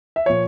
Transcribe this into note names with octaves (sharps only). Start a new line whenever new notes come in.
E5
A#2 F3 C#5